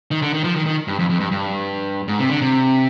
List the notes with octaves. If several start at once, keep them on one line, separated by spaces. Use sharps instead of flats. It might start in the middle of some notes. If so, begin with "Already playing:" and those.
D#3
D3
D#3
F3
D#3
D#3
G2
F2
F2
G2
G2
G#2
C3
D3
C3